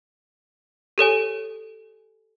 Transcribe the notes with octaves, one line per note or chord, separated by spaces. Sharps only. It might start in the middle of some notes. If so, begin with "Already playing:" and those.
G4 A4 C#5 G#5